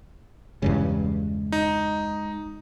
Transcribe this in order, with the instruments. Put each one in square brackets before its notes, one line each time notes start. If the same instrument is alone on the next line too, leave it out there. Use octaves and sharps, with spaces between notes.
[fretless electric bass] E2 G2 C#3 [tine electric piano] G#3
[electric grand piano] D#4